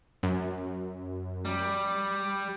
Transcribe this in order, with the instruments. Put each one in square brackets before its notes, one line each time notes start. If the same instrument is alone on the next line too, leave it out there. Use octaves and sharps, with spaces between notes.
[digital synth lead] F#2
[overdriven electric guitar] G3